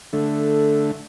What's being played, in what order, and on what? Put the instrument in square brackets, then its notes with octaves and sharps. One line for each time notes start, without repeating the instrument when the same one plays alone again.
[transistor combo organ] D3 A3